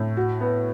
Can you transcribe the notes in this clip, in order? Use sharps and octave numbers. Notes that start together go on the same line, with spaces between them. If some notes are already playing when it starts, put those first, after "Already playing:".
Already playing: A2
F#4
B3